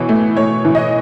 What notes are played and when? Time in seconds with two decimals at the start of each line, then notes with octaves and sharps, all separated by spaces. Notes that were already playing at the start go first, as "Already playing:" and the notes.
Already playing: B2 E3 C#5
0.09 A3
0.37 A3 C#5
0.65 E3
0.75 D#5